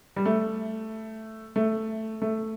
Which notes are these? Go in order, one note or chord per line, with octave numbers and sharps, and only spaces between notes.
G3
A3
A3
A3